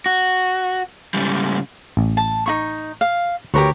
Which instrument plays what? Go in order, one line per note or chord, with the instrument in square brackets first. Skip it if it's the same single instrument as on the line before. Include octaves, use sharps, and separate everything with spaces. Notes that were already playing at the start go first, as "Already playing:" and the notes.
[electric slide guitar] F#4
G#2 C#3 G3
[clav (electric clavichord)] A1
[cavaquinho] A5
D#4 E4 C#6
F5
[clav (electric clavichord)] D2 B4 [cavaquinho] G4 A#4 C#5